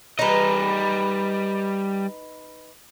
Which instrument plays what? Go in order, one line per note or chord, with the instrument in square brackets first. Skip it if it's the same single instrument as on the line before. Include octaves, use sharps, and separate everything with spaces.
[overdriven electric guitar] G3 D#5 [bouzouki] D#4 B4